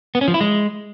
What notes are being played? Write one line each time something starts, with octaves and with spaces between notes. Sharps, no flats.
B3
C#4
F3
E4
G#3